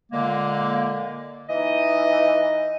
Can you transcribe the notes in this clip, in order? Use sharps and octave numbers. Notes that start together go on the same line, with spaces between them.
A#2 D3 G#3 A#3
E3 D#4 D#5